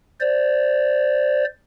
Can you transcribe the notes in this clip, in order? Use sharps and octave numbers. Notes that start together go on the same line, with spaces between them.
C5 D5